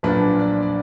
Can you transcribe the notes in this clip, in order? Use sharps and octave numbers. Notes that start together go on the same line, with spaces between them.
B1 A#2 F3 A#3 D4 B4
D5
D5